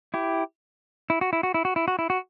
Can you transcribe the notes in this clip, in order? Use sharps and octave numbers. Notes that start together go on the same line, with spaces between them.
E4 G4
E4
F#4
E4
F#4
E4
F#4
E4
F#4
E4
F#4